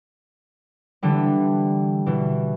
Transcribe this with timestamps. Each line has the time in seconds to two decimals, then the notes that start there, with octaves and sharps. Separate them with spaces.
1.02 D3 E3 G3 B3
2.06 B2 E3